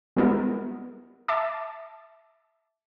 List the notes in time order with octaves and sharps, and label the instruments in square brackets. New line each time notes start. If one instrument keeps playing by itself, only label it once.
[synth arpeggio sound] G3 G#3 B3 E4 A#4
E5 A5 D6